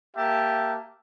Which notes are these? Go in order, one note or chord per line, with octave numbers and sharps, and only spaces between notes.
A#3 G4 E5 A5